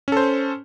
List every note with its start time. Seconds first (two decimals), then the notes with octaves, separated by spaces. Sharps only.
0.08 C#4
0.12 A4
0.17 C5